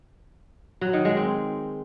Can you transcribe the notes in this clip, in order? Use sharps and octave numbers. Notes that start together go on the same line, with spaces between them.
F#3
D#3
G#3
C4